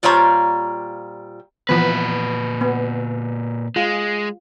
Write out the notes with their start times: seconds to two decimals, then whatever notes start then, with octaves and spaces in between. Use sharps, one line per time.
0.03 A#2 G3 F4 C5 C#5 A#5
1.69 A#2 E3 F3 B3 B4
2.61 B3
3.76 G#3 F4